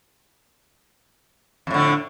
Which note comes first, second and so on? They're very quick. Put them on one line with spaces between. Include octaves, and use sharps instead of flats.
F2 A2 D3